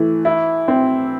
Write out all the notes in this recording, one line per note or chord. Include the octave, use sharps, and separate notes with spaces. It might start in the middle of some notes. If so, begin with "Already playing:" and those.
Already playing: E3 A3
E4
C4